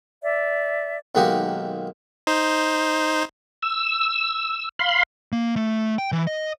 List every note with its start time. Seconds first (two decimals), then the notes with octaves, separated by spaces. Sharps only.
0.24 D5 E5
1.15 B1 D#3 G#3 A#3 F#4 G4
2.27 D#4 C5
3.63 E6
4.79 F5 B5 C6
5.32 A#3
5.56 A3
5.98 G5
6.12 E3
6.27 D#5